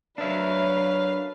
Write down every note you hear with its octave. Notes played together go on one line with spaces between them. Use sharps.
F#3 D4 A#4 B4 C#5 E5 F5